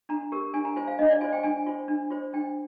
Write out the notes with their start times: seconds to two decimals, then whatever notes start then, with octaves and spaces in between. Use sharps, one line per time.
0.09 D4 A#5
0.32 G4 A#4
0.54 D4 G#5
0.65 A#5
0.76 F4 C5 G#5
0.87 F5
0.99 D4 D#5
1.10 D5
1.21 F4 C5 G#5
1.33 G5
1.43 D4 G#5
1.66 F4 C5
1.88 D4
2.10 F4 C5
2.33 D4 G5